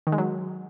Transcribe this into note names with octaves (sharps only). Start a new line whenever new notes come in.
D#3
G#3
F#3